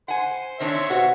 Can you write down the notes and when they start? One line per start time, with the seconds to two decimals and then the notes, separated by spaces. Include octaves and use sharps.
0.08 C5 F#5 G#5
0.60 D#3 C4 D4 C#5 E5
0.90 B2 F#4 C5 F#5